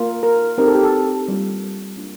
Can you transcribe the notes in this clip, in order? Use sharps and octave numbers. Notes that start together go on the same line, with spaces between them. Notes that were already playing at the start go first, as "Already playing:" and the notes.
Already playing: A#3 F4
A#4
C4 D#4 G4 A#4
A4
G4
A4
G3 A#3 F4
A#3 D4 F4